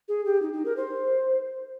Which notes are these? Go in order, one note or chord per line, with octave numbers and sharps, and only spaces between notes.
G#4
G4
D#4
D#4
A#4
C5